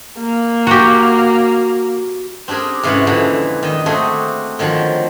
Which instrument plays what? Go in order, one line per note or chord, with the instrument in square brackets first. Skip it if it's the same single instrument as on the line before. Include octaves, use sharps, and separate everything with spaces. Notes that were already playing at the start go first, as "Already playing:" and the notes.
[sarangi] A#3
[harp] F#4 G4
[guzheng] C4 D4 G4 G#4 A#4
G#2 C3 E3 C#4 F#5
F2 A#2 D3 E3 G#3
D#3 D#5
A3 C4 D4 F#4 G#4
D3 D#3 F3 F#3